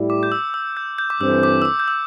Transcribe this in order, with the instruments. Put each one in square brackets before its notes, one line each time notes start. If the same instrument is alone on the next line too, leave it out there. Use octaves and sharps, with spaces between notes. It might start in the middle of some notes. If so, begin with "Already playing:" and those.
Already playing: [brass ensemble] A2 G3 E4 G4 D5
[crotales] D6
G6
E6
E6
G6
G6
D6
[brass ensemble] G2 E3 C4 A4 C5 [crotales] E6
[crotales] D6
E6
D6
G6
E6